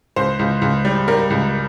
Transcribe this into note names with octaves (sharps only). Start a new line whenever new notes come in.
C#2 C5
C#2
C#2
G3
G3 A#4
C#2